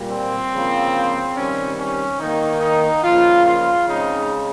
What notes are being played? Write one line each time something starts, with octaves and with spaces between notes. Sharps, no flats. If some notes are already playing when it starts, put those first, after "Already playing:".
Already playing: A#2 G3 A#3
C4
C#3 F3 A#3
C3 D#3 G3 C#4
C#4
D#3 A#3 D#4
D#4
C#3 F3 A#3 F4
F4
C#3 G#3 C4 D#4